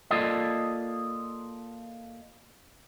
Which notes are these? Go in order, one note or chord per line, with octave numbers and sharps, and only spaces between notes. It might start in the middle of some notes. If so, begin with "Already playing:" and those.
A#3 F4 A4 D5 D#5